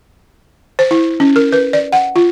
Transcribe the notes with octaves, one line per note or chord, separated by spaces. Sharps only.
C5
E4
C#4
A#4
B4
D5
F#5
F4